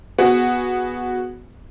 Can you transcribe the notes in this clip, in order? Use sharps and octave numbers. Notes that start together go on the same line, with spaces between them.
B3 F#4 G#4